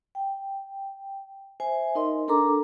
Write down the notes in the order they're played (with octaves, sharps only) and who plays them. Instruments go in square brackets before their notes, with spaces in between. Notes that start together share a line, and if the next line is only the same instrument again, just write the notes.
[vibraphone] G5
C5 E5 G#5
D#4 A#4 D#5 C6
D4 A4 A#4 A#5 D6